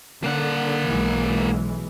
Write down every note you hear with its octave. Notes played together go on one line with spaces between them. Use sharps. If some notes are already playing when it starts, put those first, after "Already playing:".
D3 A#3 F#5
B1 E3 G#3